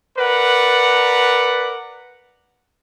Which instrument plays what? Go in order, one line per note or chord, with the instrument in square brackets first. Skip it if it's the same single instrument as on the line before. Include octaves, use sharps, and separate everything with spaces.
[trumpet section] A#4 B4 D5 F#5